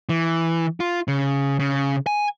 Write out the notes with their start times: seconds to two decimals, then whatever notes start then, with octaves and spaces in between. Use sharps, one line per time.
0.09 E3
0.80 F4
1.08 C#3
1.59 C#3
2.07 G#5